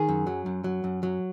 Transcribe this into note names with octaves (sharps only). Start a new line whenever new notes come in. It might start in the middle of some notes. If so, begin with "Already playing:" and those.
Already playing: D#3 G#4
F#2
F#3
F#2
F#3
F#2
F#3